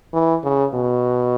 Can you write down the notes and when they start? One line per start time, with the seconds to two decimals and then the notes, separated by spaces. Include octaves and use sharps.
0.14 E3
0.44 C#3
0.74 B2